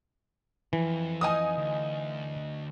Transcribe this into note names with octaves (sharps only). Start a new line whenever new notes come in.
F2 E3
D#4 D#5 F5 G#5 D#6
D2